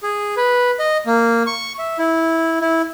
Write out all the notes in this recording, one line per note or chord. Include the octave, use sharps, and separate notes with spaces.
G#4
B4
D#5
A#3
C#6
E5
E4
E4